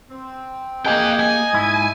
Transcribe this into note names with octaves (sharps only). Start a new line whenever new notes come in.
C4
A#3 G4 G#4 D#5 F5 G5
G#5
G#2 E4